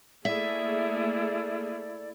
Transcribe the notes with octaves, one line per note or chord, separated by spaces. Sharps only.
A3 A#3 E4 G#4 A4 D5 E5